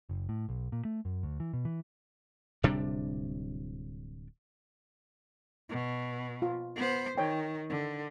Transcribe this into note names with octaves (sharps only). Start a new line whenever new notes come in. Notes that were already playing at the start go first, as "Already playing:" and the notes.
F#1
A2
B1
A#2
A3
F#2
D2
E3
B2
E3
D1 C3 G3 D4
B2
F4
B3 C5
D#3 C#5 G5
D3